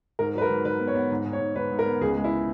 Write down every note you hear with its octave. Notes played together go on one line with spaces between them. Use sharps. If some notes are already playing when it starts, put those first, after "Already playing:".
G#2 A#4
F#3 B4
A#4
G#2
G#2 B4
B3
C#5
B3
G#2
G#2
C#5
G#2
G#2 B4
G#2
A#4
B3
C#2 G#4
G#3
E4